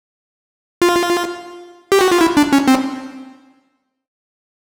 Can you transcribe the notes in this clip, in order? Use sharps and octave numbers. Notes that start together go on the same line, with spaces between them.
F4
G4
F#4
F4
E4
D4
C#4
C4